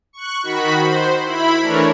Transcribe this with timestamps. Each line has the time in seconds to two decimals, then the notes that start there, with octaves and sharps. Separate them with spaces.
0.13 C#6 F#6
0.43 D#3 F#4 B5
0.80 C5
1.24 E4 B5
1.61 E3 A3 D4 A#4 C#5